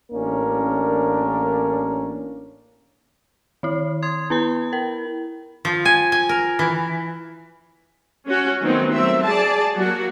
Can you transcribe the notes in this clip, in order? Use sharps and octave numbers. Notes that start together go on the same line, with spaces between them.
A1 A#3 C#4 D4 A#4
D#3 E4
C6 D#6 G#6
B3 E4 B4 A#5
A#4
F3
G#5
G#5
A#4
E3
C#4 F#4
D#3 F#3 A3 B3 C4 D#4
F#3 A3 C4 E5
G#4 D5 A5
F#3 A#3 F#4